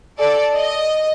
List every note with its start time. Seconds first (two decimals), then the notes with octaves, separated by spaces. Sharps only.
0.18 A4 D5
0.54 D#5